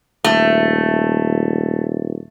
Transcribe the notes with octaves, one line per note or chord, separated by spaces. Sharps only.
D#1 A3